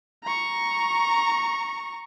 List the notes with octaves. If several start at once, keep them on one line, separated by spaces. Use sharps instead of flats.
A#5 C#6